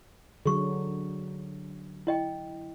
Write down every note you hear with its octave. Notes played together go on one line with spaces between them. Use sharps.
D3 F#3 G#4 C#6
E4 D#5 G5